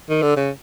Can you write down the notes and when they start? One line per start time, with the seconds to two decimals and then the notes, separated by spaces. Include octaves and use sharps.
0.10 D#3
0.22 D3
0.37 C#3